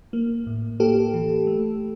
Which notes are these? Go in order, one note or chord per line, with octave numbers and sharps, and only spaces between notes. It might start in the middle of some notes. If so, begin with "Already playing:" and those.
A#3
A2
A#3 G4 A4
E3
A3